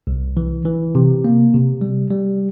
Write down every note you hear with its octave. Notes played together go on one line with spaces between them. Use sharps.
C2
E3
E3
C3
A#3
C3
G3
G3